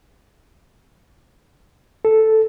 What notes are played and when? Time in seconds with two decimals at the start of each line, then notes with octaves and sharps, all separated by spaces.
2.05 A4